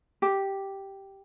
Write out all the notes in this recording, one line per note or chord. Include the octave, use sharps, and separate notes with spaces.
G4